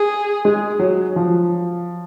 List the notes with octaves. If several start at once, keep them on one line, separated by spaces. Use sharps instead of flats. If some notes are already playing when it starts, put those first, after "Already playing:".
Already playing: G#4
G#3
F#3
F3